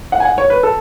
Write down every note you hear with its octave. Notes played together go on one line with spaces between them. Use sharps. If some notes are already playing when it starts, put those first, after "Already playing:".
F#5
G#5
F#5
C#5
B4
A4